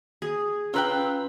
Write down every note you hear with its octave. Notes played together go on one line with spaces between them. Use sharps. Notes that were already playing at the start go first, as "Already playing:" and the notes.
G#4
C#4 F4 B4 G5 A#5 E6 F#6